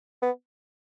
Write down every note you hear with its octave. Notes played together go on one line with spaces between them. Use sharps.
B3